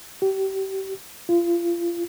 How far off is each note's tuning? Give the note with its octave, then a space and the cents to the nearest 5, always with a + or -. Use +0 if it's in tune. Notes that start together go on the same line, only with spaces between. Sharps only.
G4 -30
F4 -30